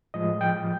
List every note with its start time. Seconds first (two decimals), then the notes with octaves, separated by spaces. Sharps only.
0.14 A2 F3 G#3 D#5
0.41 G5